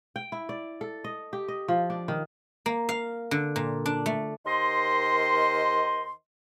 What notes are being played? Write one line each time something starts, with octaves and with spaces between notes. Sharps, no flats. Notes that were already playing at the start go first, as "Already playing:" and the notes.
G5
E4
D5
A4
D#5
G4
D#5
F3
D4
D#3
A#3
F5
D3
A#2
D4
A3
D#2 D#3 C5 D#5 C6